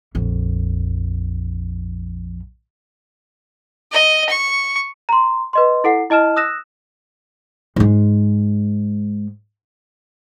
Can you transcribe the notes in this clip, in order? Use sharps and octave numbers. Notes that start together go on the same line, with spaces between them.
A#1 F2
D#5
C#6
A#5 C6
B4 D#5 C6
E4 A4 F#5 C7
E4 D#5 A5 F6 E7
D#6 E6 F#6 A#6 E7
G#2 G#3